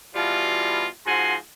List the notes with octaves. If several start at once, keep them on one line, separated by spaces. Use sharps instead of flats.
B2 E3 G3 F4
G#2 F3 F#4 G#5 C6